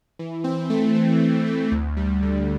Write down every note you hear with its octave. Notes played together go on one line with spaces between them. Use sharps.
E3
C4
A3
E3
E3
C4
D2
G3
D3